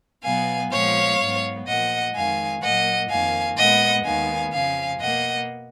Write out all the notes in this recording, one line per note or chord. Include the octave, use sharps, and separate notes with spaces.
B2 F#3 B3 F5 G#5
A#2 F3 G#3 B3 C#5 F5
G#2 F#3 B3
A#2 F3 A#3 D#5 F#5
F2 D#3 G#3 F5 G#5
A#2 F#3 A#3 D#5 F#5
F2 D#3 A#3 F5 G#5
A#2 G#3 B3 D#5 F#5
D#2 D#3 G#3 B3 F5 G#5
F2 C#3 F3 F5 G#5
B2 A#3 D#5 F#5